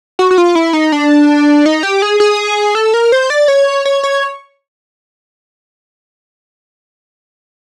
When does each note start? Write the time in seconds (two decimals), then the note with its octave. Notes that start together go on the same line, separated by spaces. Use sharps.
0.19 F#4
0.31 F#4
0.38 F4
0.55 E4
0.73 D#4
0.92 D4
1.66 D#4
1.83 G4
2.02 G#4
2.20 G#4
2.75 A4
2.94 A#4
3.12 C5
3.30 D5
3.48 C#5
3.85 C#5
4.03 C#5